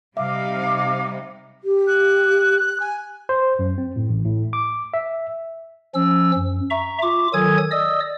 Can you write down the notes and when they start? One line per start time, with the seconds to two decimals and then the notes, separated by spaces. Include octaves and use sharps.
0.17 C3 G3 D#4 E5 F5 D6
1.64 G4
1.87 F#6
2.80 G#5
3.29 C5
3.59 F#2
3.78 C4
3.96 A2
4.09 A1
4.25 A2
4.53 D6
4.94 E5
5.95 F3 C#4 E6
6.34 F#2
6.70 E5 A#5 C#6
7.02 F4 D6
7.34 D#3 F#3 A4 G#5 D#6 G#6
7.71 D5 D#5 D#6 E6